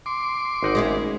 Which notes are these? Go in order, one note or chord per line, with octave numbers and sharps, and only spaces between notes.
C6 D6
G#1 D#4 F#5
G#3 C#4 E4